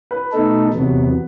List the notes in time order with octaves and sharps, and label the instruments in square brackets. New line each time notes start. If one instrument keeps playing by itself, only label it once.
[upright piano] B4
[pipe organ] B2 A3 D#4 A4
E2 C3 F#3 B3